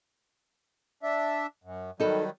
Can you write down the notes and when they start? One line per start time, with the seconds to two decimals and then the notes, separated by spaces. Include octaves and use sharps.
1.03 D4 E5
1.64 F#2
2.00 D#3 F#3 G3 D#4 A4 B4